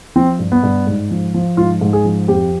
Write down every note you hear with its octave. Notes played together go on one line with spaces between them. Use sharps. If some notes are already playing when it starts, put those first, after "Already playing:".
F3 C4
G2
B3
G2
G#2
F3
F3
G#2 F4
G#2
G#4
F3
F2 G4